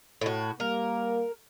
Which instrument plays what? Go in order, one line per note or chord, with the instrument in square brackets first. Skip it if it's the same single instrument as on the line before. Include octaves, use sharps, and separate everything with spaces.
[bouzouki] A2 F#4
[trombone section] G3 A#3 [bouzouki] A#4